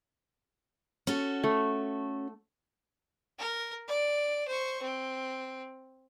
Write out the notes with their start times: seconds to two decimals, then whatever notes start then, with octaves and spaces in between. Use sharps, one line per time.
1.07 C#4 F#4 A4
1.44 A3
3.39 A#4
3.88 D5
4.47 C5 C#6
4.82 C4